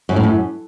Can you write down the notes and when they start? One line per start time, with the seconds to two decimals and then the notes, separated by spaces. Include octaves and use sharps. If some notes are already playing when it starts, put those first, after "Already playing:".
0.09 F#2
0.16 A2
0.23 F#2